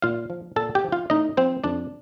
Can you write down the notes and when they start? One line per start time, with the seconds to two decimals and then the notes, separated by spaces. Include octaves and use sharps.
0.02 A#2 F4 F5
0.30 F3
0.56 A#2 A4 A5
0.75 G4 G5
0.84 F3
0.92 F4 F5
1.10 A2 D#4 D#5
1.37 F3 C4 C5
1.64 F2 D4 D5